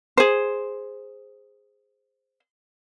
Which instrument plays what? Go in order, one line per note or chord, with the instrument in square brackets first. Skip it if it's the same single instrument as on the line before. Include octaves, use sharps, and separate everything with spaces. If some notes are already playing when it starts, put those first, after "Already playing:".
[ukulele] G#4 C5